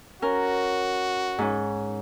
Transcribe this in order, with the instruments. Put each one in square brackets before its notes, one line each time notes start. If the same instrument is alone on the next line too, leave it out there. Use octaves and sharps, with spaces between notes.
[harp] C#4 A#4 [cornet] F#4
[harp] G#2 C#4